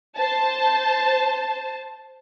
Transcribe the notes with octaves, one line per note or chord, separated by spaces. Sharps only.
C5 A5